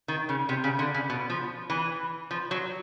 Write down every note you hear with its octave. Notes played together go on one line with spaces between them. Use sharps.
D#3
C#3
C3
C#3
D3
C#3
B2
F3
E3
F3
F#3